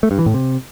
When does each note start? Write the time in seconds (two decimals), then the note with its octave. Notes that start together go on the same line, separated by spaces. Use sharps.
0.03 A3
0.11 G2
0.19 E3
0.26 A2
0.34 C3